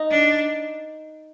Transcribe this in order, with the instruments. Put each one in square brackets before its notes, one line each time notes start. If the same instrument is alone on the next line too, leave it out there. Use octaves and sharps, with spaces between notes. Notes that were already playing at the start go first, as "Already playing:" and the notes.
Already playing: [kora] D#4
[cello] D4